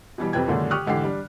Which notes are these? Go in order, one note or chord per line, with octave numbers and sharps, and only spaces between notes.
B2 E3 G3
F2 C3 B4 G5 G#6
F#2 A#2 D3 D#3 G#3 D4
G4 C#6 D#6 F6 F#6
G#2 D3 E3 G4 C7
G3 D4